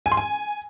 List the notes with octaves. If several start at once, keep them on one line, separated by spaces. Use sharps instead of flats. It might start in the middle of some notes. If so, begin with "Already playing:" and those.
G#5
C6
G#5